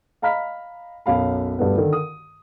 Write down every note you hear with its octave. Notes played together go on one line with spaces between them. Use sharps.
D#5 F5 A#5 B5 F6 B6
B1 F#2 F5 B5
D2 G2 G3 A3 B3
D3 D#3 A4 A#4
D#6